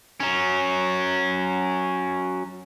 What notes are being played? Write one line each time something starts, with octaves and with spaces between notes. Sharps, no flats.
F#3 C#4